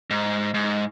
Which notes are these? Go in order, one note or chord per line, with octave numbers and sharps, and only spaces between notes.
G#2
G#2